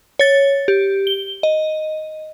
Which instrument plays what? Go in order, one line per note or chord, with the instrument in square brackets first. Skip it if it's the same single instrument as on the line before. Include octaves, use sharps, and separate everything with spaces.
[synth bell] C#5 A6
G4
G7
D#5